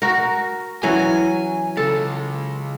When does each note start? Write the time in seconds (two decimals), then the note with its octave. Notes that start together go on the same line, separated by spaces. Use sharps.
0.02 F#4 A#4
0.83 E3 F#3 C#4 G#5
1.77 C#2 C#3 A4